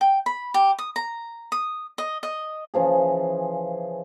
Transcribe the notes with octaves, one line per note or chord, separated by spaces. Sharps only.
G5
B5
G4
D#6
A#5
D#6
D#5
D#5
C#3 E3 F3 G#4